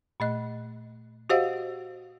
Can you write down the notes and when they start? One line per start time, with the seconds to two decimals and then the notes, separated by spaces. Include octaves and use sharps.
0.20 A#2 A3 D#5 F#6
1.30 F#4 G4 C5 D#5 F5 F#5